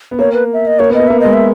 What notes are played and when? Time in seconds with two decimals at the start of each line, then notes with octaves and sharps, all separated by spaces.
0.11 B3
0.19 A#3 C#5
0.34 B4
0.53 E5
0.67 D#5
0.79 A#3 C#5
0.90 B3
0.94 D#5
1.00 B3
1.08 A#3 E5
1.20 G#3 D#5
1.33 E5